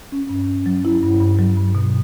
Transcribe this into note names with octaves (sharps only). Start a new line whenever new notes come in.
C#4
G2
C#4
F#3
E4
G2
G2
F#3
G2
B2